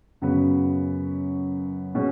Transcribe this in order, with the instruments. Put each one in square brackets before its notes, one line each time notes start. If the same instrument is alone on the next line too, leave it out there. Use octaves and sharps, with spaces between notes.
[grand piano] F#2 C#3 F#3 B3
B2 G#3 C#4